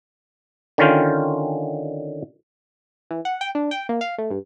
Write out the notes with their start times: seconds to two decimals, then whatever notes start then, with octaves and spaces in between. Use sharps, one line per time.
0.78 D3 D#3 C#4 F4 G5
3.11 E3
3.25 F#5
3.41 G5
3.55 D4
3.71 G5
3.89 A#3
4.01 F5
4.18 A3
4.30 G2